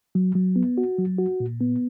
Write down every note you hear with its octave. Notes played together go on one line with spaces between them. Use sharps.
F#3
F#3
B3
F#4
F#3
F#4
A#2
B3